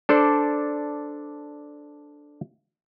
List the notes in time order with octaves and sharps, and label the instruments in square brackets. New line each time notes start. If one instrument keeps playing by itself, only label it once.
[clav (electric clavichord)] D4 A4 C5 D5